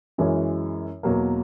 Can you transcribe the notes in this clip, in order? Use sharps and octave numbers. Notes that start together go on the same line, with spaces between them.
F#2 E3 G#3 C#4 E4
E2 B2 F#3 A#3